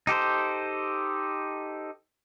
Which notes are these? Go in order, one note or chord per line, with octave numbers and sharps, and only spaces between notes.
D#4 G4 A4 C5